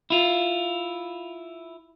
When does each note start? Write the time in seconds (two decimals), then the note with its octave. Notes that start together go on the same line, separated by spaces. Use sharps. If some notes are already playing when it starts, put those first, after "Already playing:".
0.10 E4 F4